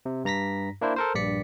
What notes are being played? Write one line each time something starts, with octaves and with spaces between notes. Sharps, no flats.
C3
G2 A#5 A#6 B6
A#3 D4 E4 C5
A4 A#4 C5
A#1 G2 D5 B6 C#7